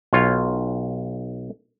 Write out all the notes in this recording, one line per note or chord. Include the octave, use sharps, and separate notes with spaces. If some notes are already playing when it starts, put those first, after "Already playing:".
B1 F4 C#5